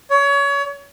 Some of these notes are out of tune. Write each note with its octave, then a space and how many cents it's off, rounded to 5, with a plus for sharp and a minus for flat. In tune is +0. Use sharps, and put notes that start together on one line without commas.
C#5 +25